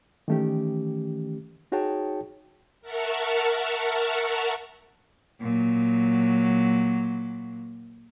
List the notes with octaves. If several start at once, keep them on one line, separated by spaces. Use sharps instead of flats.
D#3 E3 A3 C#4 G4
D#4 F#4 G#4 C#5 G5 A5
A#4 E5 F#5 A5 C#6 F6
A#2 F#3